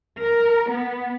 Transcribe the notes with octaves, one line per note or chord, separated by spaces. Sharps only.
A#4
B3